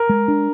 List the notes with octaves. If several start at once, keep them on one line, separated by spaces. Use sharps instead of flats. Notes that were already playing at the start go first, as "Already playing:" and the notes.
Already playing: A#4
G#3
D4